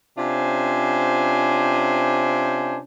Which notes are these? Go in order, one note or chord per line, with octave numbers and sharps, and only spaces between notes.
C3 C#4 D4 F4 C5 G#5